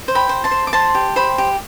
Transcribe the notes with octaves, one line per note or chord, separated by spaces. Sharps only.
C5
G5 B5
C5
A5 C6
C5
D6
C5 A5 C6
G4
C5 G5 B5
G4